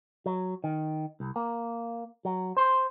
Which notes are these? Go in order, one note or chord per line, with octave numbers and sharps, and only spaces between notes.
F#3
D#3
C2
A#3
F#3
C5